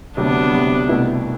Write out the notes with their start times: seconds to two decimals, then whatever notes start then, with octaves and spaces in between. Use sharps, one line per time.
0.17 D2 C3 F#3 B3 D4
0.52 D2 C3 F#3
0.89 C2 B2 A3 E4 B4